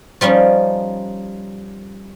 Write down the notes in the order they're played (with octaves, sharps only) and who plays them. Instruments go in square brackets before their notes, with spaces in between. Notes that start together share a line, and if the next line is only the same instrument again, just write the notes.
[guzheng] F3 G3 C#4 D#4